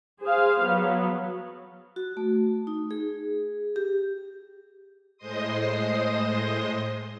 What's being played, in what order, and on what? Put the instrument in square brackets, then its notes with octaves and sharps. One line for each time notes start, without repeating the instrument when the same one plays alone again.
[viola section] G#4 C5 F5
F#3 B3
[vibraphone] F#4
A3
D#4
G#4
G4
[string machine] A2 G#3 C5 D#5 C6 D#6